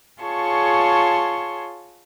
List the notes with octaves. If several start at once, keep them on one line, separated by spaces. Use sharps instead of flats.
F4 G#4 C#5 A5 C6 C#6